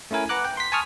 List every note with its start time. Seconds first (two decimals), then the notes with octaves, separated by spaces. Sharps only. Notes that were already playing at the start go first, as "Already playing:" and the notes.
0.11 A3 C#4 E4 A#4 G#5
0.29 B4 F#5 A#5 D6 F#6
0.45 G5
0.57 C6 B6
0.72 G#5 A5 C#6 D#6 F6